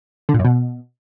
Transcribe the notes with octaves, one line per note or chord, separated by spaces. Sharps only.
D3
A#2
F#2
B2